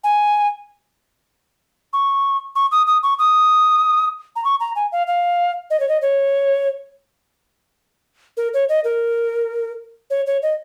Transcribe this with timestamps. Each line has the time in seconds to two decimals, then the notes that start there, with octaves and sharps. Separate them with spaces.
0.04 G#5
1.93 C#6
2.56 C#6
2.72 D#6
2.87 D#6
3.03 C#6
3.19 D#6
4.36 A#5
4.45 C#6
4.60 A#5
4.76 G#5
4.92 F5
5.07 F5
5.70 D#5
5.80 C#5
5.89 D#5
6.02 C#5
8.37 A#4
8.54 C#5
8.69 D#5
8.84 A#4
10.10 C#5
10.27 C#5
10.42 D#5